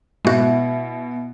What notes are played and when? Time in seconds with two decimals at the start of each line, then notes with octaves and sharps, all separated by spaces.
0.25 B2 G#3 E4 F#4